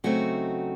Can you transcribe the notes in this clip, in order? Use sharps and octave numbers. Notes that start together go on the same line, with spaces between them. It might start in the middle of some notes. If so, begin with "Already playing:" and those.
C#3 F#3 A3 C4 D#4 F#4